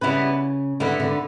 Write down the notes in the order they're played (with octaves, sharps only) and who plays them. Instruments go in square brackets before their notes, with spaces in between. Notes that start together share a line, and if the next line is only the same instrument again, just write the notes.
[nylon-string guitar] C#3 [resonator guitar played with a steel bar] G3 B3 E4 B4
[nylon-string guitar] D3 [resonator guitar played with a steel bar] G3 B3 E4 B4
[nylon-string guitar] D3